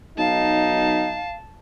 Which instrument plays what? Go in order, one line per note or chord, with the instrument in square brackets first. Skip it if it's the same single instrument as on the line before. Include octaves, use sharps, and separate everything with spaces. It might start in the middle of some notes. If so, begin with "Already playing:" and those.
[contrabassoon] B1 [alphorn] D#4 [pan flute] F5 [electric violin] A5